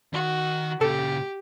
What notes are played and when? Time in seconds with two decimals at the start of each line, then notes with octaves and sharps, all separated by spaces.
0.13 D#3 F#4
0.81 A#2 C#3 G4 A4